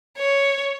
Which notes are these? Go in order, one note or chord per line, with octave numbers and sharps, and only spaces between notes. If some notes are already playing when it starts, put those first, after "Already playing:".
C#5